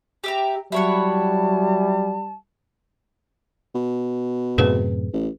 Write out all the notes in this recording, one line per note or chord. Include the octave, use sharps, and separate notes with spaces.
G4 E5 A#5
F#3 G3 E4 C#5 F#5 A5
B2
F#2 A2 C3 G#4 B4
A1